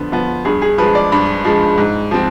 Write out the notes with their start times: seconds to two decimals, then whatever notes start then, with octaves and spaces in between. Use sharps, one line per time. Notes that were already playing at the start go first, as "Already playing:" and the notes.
Already playing: D3 F3 B3
0.12 F3 B3
0.45 G2 G#4
0.62 G#4
0.78 F3 G#3 B4
0.95 D5
1.12 G2 B5
1.45 F3 G#3
1.78 G#2
2.11 F3 C4